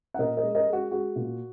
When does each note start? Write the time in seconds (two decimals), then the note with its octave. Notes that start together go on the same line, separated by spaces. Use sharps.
0.14 F#5
0.19 A#2 A#4 D#5
0.37 A#4 D#5
0.43 G#3
0.55 A#4 D#5
0.67 G#3
0.73 F#4
0.91 G#3 F#4
1.16 A#2